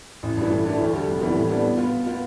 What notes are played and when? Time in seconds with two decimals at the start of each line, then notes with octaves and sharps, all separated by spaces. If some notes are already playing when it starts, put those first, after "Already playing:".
0.23 A1
0.37 G2 E3
0.51 A2
0.65 E3 A3 D4
0.79 D2
0.93 D3 G3
1.07 F1
1.21 F2 E3 G3 B3
1.35 A2
1.50 G3 B3 D4
1.64 B2
1.78 B3 F4
1.92 B2
2.06 B3 F4